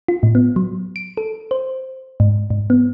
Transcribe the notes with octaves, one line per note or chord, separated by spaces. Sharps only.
F4
A2
B3
F#3
D7
A4
C5
G#2
G#2
B3